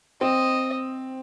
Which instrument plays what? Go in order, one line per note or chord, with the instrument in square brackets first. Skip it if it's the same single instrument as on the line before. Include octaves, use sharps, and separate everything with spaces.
[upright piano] C4 [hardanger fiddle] D#5